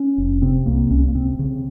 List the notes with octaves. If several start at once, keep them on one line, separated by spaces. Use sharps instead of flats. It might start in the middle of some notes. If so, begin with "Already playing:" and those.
Already playing: C#4
F1
C3 C4
C2 A#3
C2 C#4
A#3
C3 C4
C#3